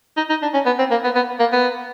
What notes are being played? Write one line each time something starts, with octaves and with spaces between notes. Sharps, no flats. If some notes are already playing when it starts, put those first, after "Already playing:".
D#4
D#4
D4
C#4
B3
C4
A#3
B3
B3
A#3
B3